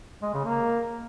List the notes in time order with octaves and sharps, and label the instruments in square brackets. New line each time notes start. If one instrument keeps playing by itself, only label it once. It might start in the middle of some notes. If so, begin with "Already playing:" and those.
[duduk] G#3
C#3
A#3